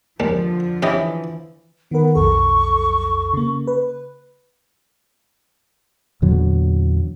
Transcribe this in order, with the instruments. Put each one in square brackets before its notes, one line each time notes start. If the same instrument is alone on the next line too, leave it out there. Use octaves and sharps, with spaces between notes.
[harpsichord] D#2 G3 G#3 [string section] D3 F3
[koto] E3 [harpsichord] C#4 G4 D#5
[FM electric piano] D#3 A#4 [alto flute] B3
[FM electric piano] B1 F2 A4 [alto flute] C#6
[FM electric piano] C#3 A#3
B4
[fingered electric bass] E2 A#2 D3 F#3